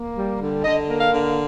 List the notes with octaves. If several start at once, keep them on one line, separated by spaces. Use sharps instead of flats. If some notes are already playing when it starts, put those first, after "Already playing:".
Already playing: A#3
G3
D3
D3 D#5
A#3
F5
D3